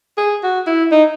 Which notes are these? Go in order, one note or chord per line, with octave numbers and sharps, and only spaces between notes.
G#4
F#4
E4
D#4